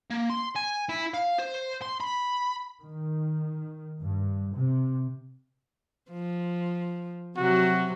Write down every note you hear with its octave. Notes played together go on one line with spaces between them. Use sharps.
A#3
C6
G#5
E4
F5
C5
C6
B5
D#3
G2
C3
F3
C3 F#3 F#4